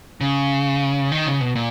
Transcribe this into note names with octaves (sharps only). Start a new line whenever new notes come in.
C#3
D#3
C#3
B2
A#2